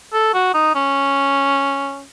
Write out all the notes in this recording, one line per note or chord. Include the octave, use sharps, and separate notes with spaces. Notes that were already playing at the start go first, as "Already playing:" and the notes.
A4
F#4
D#4
C#4